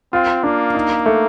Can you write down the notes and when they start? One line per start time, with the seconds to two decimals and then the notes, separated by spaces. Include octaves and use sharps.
0.13 C4 F4
0.43 A#3 D4
0.74 D#4
1.06 A3